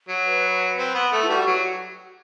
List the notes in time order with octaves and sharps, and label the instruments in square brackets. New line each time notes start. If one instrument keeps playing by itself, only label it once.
[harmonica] F#3
[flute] B4
[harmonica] C4
B3
A3
[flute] E4
[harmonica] G3 [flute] F#4
[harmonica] F#3 [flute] F#4